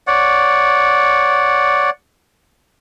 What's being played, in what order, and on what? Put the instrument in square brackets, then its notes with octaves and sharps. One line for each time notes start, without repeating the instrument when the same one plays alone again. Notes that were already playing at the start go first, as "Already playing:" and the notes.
[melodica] C#5 D5 F#5